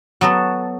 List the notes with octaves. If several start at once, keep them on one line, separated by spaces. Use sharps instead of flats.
F#3 B3 F#4 A4